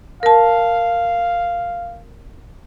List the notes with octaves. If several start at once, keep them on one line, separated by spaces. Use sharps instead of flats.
A#4 F5 A5